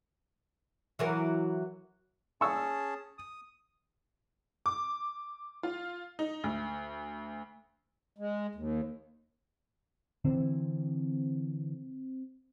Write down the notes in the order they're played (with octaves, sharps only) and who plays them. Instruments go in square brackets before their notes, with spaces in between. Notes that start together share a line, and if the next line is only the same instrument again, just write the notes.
[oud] E3 F#3 A#4
[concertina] C#4 G#4 A5 [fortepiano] C#6 E6
[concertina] D#6
[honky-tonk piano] D6
F4
D#4
D2
[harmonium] G#3
D#2
[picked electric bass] D3 E3 [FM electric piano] C4